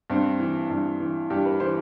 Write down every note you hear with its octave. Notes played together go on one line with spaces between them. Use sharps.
G2 C4
E3
G2
E3
G2 G4
B4
E3 C5